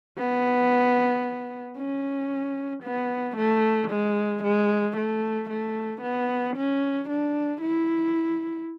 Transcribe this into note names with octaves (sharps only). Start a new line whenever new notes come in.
B3
C#4
B3
A3
G#3
G#3
A3
A3
B3
C#4
D4
E4